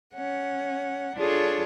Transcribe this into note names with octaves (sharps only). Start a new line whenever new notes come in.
C#4 F#5
D4 F4 G#4 A4 C#5